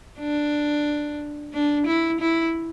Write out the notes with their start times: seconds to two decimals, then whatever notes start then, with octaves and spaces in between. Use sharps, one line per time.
0.19 D4
1.54 D4
1.86 E4
2.20 E4